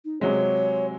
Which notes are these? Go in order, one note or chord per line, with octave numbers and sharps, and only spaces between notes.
D#4
C3 F#3 G#3 C#5